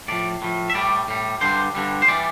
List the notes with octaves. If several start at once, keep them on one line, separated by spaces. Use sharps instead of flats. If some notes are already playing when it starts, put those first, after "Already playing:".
A2 F3 D5
A2 F3
E5
A2 G3 D5
A2 G3
G2 D3 G3 C5
G2 D3 G3
C5
E3 G3 D5